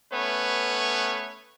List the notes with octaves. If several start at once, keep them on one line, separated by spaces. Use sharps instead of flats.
A3 B3 C#4 B4 C#5